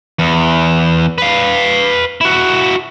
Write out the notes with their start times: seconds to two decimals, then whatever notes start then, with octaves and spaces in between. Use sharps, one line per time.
0.19 E2
1.18 B4 F5
2.21 E4 F#4